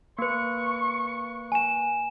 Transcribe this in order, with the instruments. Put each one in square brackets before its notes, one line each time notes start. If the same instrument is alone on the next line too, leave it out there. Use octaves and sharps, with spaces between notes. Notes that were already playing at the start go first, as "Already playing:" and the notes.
[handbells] A#3 B4 [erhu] C#6
[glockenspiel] G#5 E7